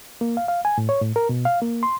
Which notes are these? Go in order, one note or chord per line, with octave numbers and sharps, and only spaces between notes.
A#3
F5
F5
G#5
A2
C#5
A2
A#4
B2
F5
A#3
C6